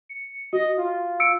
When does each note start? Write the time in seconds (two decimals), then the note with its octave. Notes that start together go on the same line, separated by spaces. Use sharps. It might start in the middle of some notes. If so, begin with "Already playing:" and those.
0.09 C#7
0.53 F#4 D#5
0.78 F4
1.20 E6 C#7 D7